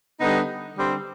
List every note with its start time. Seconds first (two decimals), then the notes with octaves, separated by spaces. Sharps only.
0.20 D3 G3 B3 D#4
0.75 D3 G3 C4